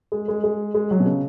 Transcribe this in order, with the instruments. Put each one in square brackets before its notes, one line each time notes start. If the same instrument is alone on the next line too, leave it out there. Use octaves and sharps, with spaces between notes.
[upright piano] G#3
G#3
G#3
G#3
F#3
B2
C#3